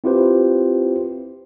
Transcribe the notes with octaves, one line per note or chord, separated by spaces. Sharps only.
C4 E4 F4 G4 B4 C5